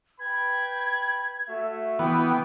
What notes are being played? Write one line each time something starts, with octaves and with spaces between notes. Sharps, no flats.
B4 G5 B5 G#6
A3 F#4 E5
E3 B3 G5